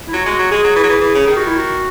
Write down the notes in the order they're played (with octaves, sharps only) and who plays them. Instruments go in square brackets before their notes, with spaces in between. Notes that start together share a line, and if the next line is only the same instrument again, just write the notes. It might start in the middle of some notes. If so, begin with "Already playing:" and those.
[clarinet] E4
[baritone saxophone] F#3 [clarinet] F#4
[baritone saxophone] G#3
F#3
[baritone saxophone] G#3 [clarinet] G#4
[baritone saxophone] F#3
E3
F#3
E3
E3
C#3
[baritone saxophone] D#3 [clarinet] G#4
[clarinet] F#4
E4
F#4